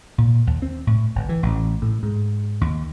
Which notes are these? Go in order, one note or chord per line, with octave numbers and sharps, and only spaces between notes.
A#2
D#2
C4
A2
G1
E3
A1
A2
G#2
D#2